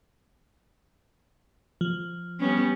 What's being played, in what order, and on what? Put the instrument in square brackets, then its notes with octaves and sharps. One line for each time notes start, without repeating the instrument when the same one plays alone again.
[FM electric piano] F3
[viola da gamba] G3 B3 C#4